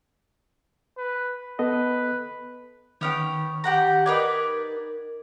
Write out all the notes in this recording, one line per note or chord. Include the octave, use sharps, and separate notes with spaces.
B4
B3 A4 B4 D#5
D#3 B3 C#4 G5
G4 F#5 A#5
D#4 A#4 B4 D5 G#6